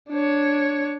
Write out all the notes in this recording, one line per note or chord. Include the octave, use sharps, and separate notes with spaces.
D4 C#5